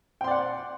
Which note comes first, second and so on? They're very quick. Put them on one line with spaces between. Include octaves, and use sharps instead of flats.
G5 C6 D5 F#5